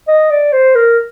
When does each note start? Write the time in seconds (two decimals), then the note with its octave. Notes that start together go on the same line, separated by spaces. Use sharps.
0.08 D#5
0.30 D5
0.52 C5
0.75 A#4